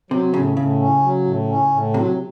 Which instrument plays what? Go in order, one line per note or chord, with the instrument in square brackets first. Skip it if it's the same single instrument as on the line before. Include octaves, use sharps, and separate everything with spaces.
[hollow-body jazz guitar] C3 [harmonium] F#3
[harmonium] A2 [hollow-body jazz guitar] C#3
[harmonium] A2 [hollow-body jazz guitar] C#3
[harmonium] C#4
F#3
A2
C#4
A2
[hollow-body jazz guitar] C3 [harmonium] F#3